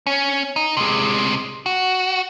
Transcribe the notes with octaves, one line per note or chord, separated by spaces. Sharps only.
C#4
D#4
C3 G#3
F#4